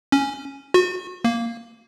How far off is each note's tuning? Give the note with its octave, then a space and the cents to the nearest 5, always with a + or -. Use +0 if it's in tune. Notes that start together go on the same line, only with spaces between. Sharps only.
C#4 +0
F#4 -35
A#3 -5